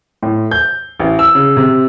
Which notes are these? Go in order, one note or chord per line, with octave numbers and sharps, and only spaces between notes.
A2
G6
A1
E6
C#3
C3